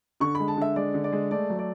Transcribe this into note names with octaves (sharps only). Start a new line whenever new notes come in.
D3 C#6
G#3 B5
A5
D3 E5
G#3 D5
D3
D5
G#3
A3 D5
F#3
D5